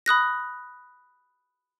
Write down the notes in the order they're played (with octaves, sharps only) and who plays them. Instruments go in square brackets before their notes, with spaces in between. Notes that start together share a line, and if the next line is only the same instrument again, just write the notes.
[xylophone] B5 D#6 F#6 A#6